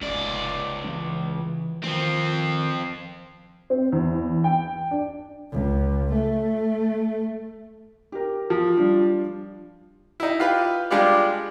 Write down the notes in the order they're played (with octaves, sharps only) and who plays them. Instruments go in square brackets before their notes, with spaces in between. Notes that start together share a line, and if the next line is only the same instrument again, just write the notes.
[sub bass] F1 [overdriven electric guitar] C#2 D5
[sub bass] E3
[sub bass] D#3 [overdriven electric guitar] F3 C4
[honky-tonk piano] C4
E2
G5
D4
[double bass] C#2
A3
[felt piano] G4 A#4
[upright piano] F3
[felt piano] G3 D4 F4
[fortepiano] D#4 E4
F4 G4 B4
G3 G#3 D4 F4 G4 D5